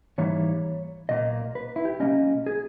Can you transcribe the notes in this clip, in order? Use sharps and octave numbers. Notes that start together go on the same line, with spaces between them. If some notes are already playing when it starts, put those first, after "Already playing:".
G#2 E3 G3 A#3 C#5
B1 A#2 A#3 D#5
B4
E4
G4
B1 B2 A#3 C#4 D#5
G#4